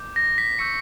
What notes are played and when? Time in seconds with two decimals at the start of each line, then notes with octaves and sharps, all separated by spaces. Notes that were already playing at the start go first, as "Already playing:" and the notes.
Already playing: D6 G6
0.16 A#6
0.38 B6
0.59 C#6 E6 G6 C#7